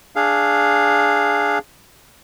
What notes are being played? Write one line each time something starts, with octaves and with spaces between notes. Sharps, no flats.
D4 G#4 F5